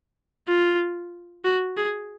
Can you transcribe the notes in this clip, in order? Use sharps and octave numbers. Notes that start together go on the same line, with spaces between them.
F4
F#4
G#4